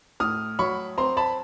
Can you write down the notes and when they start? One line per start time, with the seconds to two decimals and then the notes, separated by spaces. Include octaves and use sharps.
0.20 A2 D#6 F6
0.59 F#3 B5 C#6
0.98 C4 A#5 C6
1.17 A5 B5